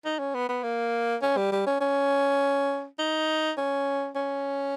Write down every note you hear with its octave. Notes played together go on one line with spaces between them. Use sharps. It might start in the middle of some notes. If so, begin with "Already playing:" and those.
D#4
C#4
B3
B3
A#3
C#4
G3
G3
C#4
C#4
D#4
C#4
C#4